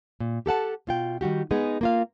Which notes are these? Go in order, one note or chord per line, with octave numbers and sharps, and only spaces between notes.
A#2
G4 A4 F#5 A5
B2 F4 G5
D#3 G3 F#4 G4
G#3 B3 D#4 G#4
A#3 F4 F5